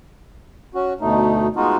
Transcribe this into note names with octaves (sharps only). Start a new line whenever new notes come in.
C#4 F#4
D2 B2 A3 D#4
G#3 B3 D#4 F4 F#4